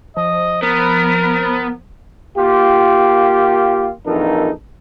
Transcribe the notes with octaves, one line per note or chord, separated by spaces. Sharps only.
F3 D#5
B3 A#4
A#3 F4 G4
A#1 F2 E3 D#4 A4 A#4